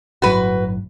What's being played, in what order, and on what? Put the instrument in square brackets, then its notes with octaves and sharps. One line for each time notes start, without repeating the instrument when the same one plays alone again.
[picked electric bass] G1 A2 F#3 [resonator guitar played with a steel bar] F#4 B4